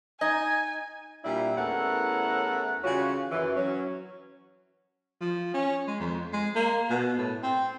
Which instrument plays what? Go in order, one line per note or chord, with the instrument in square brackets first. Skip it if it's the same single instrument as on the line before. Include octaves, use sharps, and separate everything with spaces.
[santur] D#4 [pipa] D#5 [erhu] G#5 [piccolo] G#6
[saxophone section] A#2 G3 D4 E4
E2 A3 C#4 E4 A#4 F#5
C#3 E3 G3 C#4 F4 F#4
F#2 E3
F#3 C#4
[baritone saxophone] F3
C#4
G#3
F2
G#3
A#3
B2
A2
C4